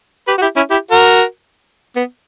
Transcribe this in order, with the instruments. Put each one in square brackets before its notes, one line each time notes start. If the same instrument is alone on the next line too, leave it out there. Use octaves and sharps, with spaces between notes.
[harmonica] G4 B4
F#4
E4 G4
C#4 E4
E4 G4
F#4 A#4
B3